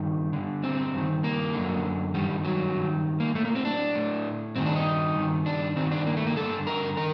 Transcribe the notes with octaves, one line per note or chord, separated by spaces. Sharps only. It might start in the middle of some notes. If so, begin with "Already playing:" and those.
Already playing: G2 D#3
G2 D3
C4
G2 D#3
A#3
F#2 D3
G2 D#3 G3
F#3
G2 D#3
A#3
A2 A3
A#3
C4
D4
A2
G2 D#3 C4
D4
D#4
G2 D#3
D4
G2 D#3 C4
D4
A#3
A3
A#3
G2 D3 A4
A#4
D#3 A#4